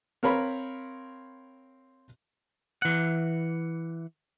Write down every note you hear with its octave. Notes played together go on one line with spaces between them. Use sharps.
C4 A#4 C#5 F5 B5
E3 F#5